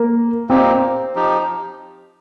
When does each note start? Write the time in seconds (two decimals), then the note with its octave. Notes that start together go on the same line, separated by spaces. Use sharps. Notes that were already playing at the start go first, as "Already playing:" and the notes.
Already playing: A#3
0.49 A#2 A#3 C4 D#4 G4
1.15 F3 D#4 G4